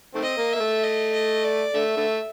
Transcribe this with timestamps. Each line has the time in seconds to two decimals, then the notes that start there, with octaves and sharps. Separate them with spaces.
0.15 D#3 A3 C4
0.23 D#5
0.38 A#3
0.53 A#3 E5
0.60 A3
0.83 D#5
1.13 D#5
1.44 D5
1.75 D3 A3 E5
1.97 D3 A3